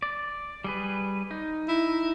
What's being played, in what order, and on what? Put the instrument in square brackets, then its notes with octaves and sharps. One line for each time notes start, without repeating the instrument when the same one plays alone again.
[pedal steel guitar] D5
G3 G#4 B4
D#4
[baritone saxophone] E4